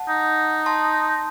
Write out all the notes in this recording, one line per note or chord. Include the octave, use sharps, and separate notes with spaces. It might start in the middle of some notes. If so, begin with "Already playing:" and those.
Already playing: F#5 A5
D#4
A5 C6